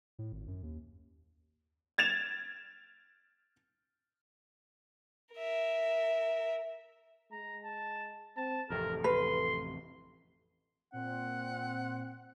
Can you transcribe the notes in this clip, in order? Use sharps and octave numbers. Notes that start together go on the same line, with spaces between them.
A2
G#1
F#2
D#2
G#6 A6 E7 F7
A#4 E5
G#3 A#5
A5
C4 A5
A1 F2 C3 A4 A#4
B4 C6
A#2 C4 F#5